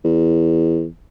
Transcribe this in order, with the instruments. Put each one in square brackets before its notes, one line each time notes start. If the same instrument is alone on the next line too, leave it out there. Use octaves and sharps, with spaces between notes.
[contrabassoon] E2